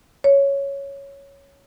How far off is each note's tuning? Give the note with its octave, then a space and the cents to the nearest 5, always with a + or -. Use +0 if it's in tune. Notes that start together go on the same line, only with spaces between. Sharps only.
C#5 +0